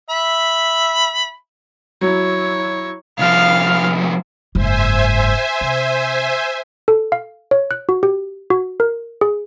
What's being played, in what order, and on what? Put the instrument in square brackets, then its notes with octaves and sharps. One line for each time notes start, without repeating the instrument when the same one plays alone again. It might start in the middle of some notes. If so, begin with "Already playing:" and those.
[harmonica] E5 B5
[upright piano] F#3 [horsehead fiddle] E4 C#5
[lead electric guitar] C2 F3 [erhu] F5
[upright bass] F#1 G#2 [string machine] C5 E5 G#5
[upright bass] C3
[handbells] A4
F5
C#5
F#6
F#4
G4
F#4
A#4
G#4